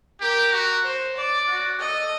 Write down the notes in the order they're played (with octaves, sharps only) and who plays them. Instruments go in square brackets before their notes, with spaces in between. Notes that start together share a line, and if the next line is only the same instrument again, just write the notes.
[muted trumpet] G4 [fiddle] A#4
[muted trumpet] F#4
[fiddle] C5
D5
[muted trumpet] F#4
[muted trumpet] A4 [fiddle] D#5